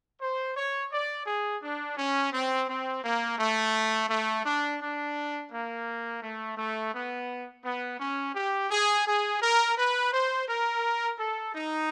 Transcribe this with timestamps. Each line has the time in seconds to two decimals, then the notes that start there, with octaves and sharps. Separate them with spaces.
0.21 C5
0.55 C#5
0.92 D5
1.26 G#4
1.62 D4
1.97 C#4
2.32 C4
2.69 C4
3.04 A#3
3.39 A3
4.09 A3
4.45 D4
4.81 D4
5.52 A#3
6.22 A3
6.57 A3
6.94 B3
7.64 B3
7.99 C#4
8.35 G4
8.71 G#4
9.06 G#4
9.41 A#4
9.77 B4
10.12 C5
10.48 A#4
11.19 A4
11.54 D#4